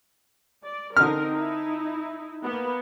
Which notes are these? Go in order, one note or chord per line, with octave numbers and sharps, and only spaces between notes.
D5
D3 C4 D#4 A#4 F6
D#4 E4
A#3 B3